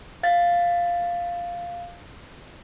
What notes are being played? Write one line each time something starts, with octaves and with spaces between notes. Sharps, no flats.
F5 A6